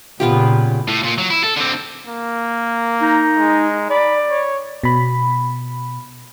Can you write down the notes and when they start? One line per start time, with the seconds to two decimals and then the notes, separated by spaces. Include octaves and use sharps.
0.20 A#2 C#3 B3 F4 G4
0.88 A2
1.03 A#2
1.18 F#3
1.30 E4
1.43 A4
1.57 D3 C4
2.07 A#3
3.01 D#4
3.36 G#3
3.90 D5 B5
4.30 C#5
4.84 B2 B5